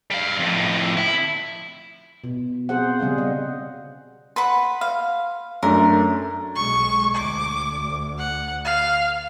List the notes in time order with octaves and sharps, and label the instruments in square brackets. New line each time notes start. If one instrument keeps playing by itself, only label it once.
[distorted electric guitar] G3 F5
F2 A2
E4
[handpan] B2
C4 G#4 C5 F#5
C#3 G3 C#4 G#4 F5
D#5
[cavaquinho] B4 F#5 B5 [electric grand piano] C6
[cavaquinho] F5
[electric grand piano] F#2 A3 D4 [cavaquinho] A#4
[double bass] B1 G#3 [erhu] C#6
[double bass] D2 [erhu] D6
[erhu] F#5
F5